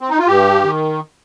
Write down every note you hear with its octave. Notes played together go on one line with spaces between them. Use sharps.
C4
D#4
F4
G2 G4
D#3